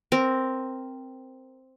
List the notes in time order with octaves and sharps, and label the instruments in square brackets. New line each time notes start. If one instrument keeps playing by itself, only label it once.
[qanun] C4 A#4